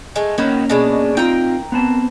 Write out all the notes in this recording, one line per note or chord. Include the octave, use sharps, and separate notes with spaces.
G#3 A3
D#3 F#3 A#3 B3 C#4
B2 G#3 D4
C4 D#4 F4 A#4 G5
B3 C4 A5